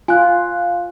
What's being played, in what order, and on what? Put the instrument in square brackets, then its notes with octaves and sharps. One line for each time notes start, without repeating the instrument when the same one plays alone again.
[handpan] F4 [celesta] G#5 F#6